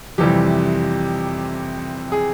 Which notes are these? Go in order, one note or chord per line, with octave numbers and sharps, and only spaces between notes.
F2 C3 E3 G3 G4
G#4